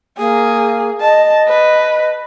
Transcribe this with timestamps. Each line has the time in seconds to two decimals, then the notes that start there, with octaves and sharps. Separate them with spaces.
0.18 A#3 G#4
1.01 D#5 A5
1.48 B4